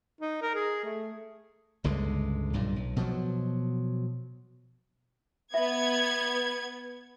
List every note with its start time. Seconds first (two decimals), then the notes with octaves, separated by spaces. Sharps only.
0.21 D#4
0.42 A#4
0.55 G#4
0.84 A3
1.84 G1 C#2 D3 G#3
2.53 B1 G2 A#2
2.76 B1
2.96 B2 F3 F#3
5.54 B3 E5 G#6